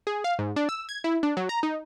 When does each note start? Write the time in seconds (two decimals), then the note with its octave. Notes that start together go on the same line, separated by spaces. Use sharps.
0.07 G#4
0.24 F5
0.39 G#2
0.56 D4
0.69 E6
0.89 G#6
1.04 E4
1.23 D4
1.37 F#3
1.49 A#5
1.63 D#4